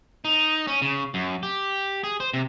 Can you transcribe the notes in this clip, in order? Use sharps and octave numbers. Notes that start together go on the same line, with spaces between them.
D#4
C#4
C#3
F#2
G4
G#4
C5
C3